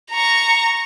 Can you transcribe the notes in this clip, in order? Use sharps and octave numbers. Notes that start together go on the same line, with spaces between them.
A#5 C#6